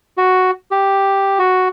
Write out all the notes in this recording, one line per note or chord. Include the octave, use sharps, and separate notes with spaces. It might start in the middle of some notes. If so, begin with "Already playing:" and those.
F#4
G4
F#4